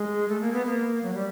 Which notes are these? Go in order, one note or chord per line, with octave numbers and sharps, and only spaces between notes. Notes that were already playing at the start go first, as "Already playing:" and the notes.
Already playing: G#3
A3
A#3
B3
A#3
F#3
G3